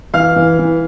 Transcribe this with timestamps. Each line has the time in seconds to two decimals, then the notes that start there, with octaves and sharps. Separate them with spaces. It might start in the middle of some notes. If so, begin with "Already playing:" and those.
0.14 E3 F5 F6
0.36 E3
0.59 E3